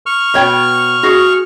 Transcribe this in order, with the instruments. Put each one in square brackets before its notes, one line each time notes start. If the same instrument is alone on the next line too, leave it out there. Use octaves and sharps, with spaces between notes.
[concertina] C#6 F6
[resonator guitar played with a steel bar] B2 C#5 G5
F#4 G#4